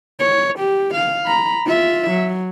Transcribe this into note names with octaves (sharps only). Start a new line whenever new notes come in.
C#5
G4
F5
A#5 B5
F4 E5
F#3